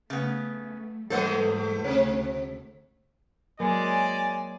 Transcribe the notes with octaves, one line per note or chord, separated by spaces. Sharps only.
C#3 A3 B3
E2 G#2 G3 A3 A4 C5 D#5 F#5
D2 C3 A3
F#3 G#3 A#3 A#4 D5 G#5